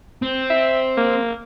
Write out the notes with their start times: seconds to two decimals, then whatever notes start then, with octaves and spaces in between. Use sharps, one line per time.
0.22 C4
0.50 E5
0.97 A#3